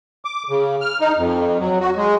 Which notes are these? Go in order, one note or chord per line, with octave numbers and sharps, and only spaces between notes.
D6
C#3
F6
D#4
F2
F#3
F#4
G#3